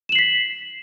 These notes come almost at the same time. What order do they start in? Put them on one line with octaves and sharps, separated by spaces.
E7 F#7 C7 B6